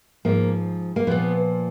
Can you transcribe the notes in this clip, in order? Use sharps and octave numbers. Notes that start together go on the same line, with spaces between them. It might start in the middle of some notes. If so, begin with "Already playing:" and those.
G#2 F3 A#3
A#3
A#2 F3 B3